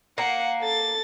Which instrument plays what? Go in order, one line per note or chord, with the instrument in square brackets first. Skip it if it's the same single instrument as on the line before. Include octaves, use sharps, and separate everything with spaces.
[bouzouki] A#3 [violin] F#5
[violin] A4 A6